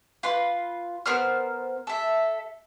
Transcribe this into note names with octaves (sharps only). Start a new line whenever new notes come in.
F4 B4 C6
B3 A#4 C5 F6
A4 E5